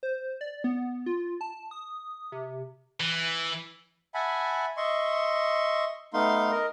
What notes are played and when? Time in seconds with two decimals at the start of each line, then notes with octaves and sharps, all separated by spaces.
0.03 C5
0.41 D5
0.64 B3
1.06 F4
1.41 A5
1.71 D#6
2.32 C3
3.00 E3
4.14 E5 F#5 G#5 A5 B5
4.77 D#5 E5 C6 C#6
6.14 A3 B3 D#4 F5 C6
6.51 A#4 D#5